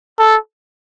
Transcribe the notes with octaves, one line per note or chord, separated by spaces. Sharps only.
A4